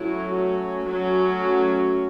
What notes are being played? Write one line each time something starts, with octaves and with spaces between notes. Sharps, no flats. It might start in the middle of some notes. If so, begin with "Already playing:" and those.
Already playing: F#3 A3 C#4 E4
F#4
F#3 A3 C#4